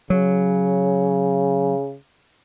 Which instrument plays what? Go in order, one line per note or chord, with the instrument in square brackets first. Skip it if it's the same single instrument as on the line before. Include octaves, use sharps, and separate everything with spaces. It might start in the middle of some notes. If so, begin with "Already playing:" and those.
[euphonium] C#3 [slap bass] F#3